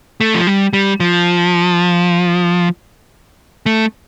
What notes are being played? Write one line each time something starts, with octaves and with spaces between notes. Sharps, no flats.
A3
F3
G3
G3
F3
A3